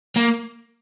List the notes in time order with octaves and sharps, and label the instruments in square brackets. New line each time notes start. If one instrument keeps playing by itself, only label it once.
[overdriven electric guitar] A#3